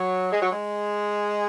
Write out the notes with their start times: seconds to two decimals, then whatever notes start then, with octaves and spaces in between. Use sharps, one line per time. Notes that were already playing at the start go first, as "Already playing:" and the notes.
Already playing: F#3
0.32 G#3
0.42 F#3
0.51 G#3